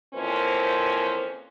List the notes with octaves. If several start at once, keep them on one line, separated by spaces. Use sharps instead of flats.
F2 E3 F3 A#3 C#4 C5